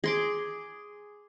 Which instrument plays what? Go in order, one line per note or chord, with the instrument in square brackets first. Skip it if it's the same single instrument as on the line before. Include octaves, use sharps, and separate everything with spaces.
[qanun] G#4 C6 D6